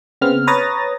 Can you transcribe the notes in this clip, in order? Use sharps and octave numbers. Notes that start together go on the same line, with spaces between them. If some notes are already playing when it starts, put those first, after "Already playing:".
C#3 B3 C4 F6
B4 C#5 A#5 D#6 A6 A#6